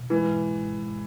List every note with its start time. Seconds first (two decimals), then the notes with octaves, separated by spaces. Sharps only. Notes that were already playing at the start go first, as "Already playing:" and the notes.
Already playing: B2
0.10 E3 G#3
0.28 G#2
0.46 G#1
0.63 G#2
0.81 G#2